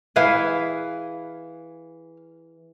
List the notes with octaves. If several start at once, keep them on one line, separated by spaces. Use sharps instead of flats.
E3 G#4 B4 F5